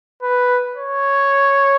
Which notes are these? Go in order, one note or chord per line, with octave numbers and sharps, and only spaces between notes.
B4
C#5